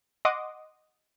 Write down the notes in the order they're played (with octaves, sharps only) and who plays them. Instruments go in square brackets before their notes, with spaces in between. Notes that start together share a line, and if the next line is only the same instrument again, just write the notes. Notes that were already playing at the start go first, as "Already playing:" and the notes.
[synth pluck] D#5 F#5 C6 D6 D#6